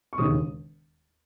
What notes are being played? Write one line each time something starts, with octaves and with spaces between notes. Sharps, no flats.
C#6
E1 D#2 C#3 G#3 D#6